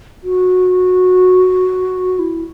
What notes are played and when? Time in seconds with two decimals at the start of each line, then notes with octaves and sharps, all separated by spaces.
0.23 F#4
2.19 E4